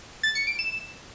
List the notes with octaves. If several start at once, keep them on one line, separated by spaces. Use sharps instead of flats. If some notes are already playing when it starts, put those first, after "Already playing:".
A6
C#7
D7
E7